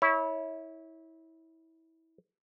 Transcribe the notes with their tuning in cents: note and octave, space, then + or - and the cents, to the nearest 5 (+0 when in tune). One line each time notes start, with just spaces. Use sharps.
E4 -25 C#5 +0